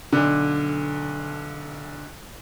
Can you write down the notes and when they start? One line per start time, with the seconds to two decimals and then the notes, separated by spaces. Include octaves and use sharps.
0.12 B1 D3